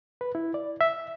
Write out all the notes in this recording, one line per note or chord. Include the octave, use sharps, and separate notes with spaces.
B4
E4
D5
E5